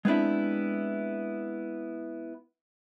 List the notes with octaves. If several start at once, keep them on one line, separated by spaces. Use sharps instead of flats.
G#3 B3 C4 D4 E4